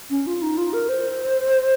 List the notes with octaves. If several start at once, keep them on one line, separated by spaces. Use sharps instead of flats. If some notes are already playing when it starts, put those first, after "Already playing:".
C#4
F4
D#4
F4
A#4
C5